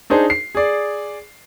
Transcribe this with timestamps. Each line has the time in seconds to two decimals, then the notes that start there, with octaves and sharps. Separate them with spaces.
0.10 D4 D#4 G#4 C5 A5
0.30 C7
0.55 G#4 D5